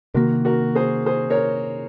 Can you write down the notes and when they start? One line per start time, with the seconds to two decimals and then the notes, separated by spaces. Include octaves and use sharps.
0.14 C3 D#3 A#3 F#4 A#4
0.45 F#4 A#4
0.75 G#4 C5
1.06 G#4 C5
1.30 A#4 C#5